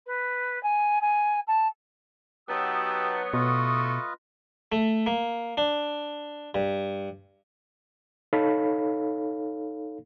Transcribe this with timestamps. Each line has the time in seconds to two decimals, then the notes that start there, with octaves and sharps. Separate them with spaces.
0.07 B4
0.63 G#5
1.02 G#5
1.48 A5
2.49 F#3 B3 D#4 G4 A5 D#6 E6
3.33 B2 A3 F4 B4 D#5 C#6 D#6
4.72 A3
5.06 A#3
5.57 D4
6.55 G2
8.33 D#4 A4 C#5 F5 B5